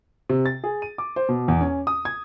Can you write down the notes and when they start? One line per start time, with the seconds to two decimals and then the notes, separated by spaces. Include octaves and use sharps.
0.29 C3
0.46 A6
0.64 G#4
0.82 D#7
0.98 D6
1.16 C5
1.29 B2
1.48 E2
1.61 C#4
1.87 D#6
2.05 G#6